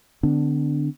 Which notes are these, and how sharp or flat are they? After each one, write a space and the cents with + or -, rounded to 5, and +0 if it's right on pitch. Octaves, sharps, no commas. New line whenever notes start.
D3 +10 B3 +45 D4 +0